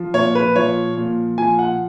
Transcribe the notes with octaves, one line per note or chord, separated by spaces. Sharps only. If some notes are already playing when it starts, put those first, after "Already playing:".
Already playing: F3
A#2 C#5
B4
F3 C#5
A#2
F3 G#5
F#5